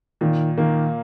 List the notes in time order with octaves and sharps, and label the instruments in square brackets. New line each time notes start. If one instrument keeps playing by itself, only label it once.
[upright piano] A#2 [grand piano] D#3
[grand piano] D#3 [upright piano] A#3